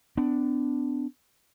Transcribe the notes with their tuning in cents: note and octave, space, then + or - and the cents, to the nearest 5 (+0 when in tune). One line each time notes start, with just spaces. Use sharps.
B3 +40 D4 +0